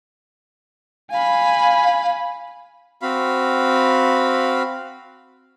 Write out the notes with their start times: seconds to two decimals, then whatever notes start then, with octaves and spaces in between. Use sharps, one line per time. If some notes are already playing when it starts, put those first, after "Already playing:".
1.11 F5 G#5 B5
3.01 C4 F#4 F5 B5